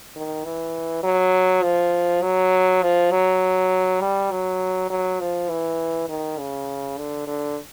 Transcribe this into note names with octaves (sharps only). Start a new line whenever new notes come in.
D#3
E3
F#3
F3
F#3
F3
F#3
G3
F#3
F#3
F3
E3
D#3
C#3
D3
D3